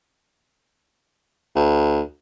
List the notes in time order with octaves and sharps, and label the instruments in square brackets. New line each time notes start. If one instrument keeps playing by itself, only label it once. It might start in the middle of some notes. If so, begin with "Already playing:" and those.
[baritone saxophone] D2